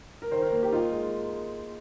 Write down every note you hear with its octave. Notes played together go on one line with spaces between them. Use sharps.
A#4
D#3 C5
A#4
A#3
G4
D#4 F4
G#3